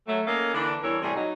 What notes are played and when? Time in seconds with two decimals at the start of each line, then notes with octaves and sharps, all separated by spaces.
0.07 F#3 A3
0.27 A#3 C#4 A4 D#5 F5
0.54 D3 E3 A#3 D4
0.82 E2 E3 G3 A4 A#4 C#5
1.02 A2 C3 G3 F#4 G#4
1.15 F#3 D#4